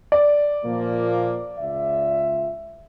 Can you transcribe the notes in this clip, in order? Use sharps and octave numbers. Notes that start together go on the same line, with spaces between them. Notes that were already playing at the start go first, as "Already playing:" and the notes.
D5
A#2 F3 A#3
C#2 F4 E5